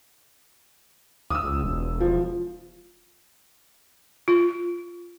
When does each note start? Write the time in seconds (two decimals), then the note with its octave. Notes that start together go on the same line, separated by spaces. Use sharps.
1.30 D2 D#6 E6
1.44 C#2
1.64 E1
2.00 F3
4.28 F4